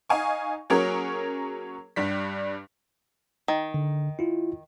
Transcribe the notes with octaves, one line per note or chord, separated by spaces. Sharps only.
D#4 F5 G#5 C#6
F#3 A#3 C#4 G#4 A#4 C#5
G2 G3 B6
D#3
D3
E4 F4